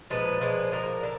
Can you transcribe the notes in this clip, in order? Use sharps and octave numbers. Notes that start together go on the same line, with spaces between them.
A#2 F3 G#3 B4
A#2 F3 G#3
D3 F3 A#3 A#4
D3